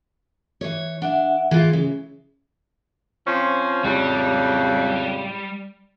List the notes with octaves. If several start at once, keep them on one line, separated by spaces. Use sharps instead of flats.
E3 C#5
D4 E5 F#5
E3 F4 G#4
C#3
F3 C4 C#4
F2 A2 C#3 G3